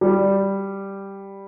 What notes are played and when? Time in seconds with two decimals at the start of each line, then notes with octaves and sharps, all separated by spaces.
0.01 G3